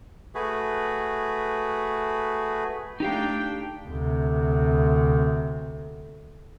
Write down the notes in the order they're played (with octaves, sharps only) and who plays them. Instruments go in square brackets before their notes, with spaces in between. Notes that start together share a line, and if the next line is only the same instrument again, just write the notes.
[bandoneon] A3 F#4 G#4 B4
[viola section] A3 D4 G5 [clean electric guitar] D#4 G4 F5
[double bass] D2 C3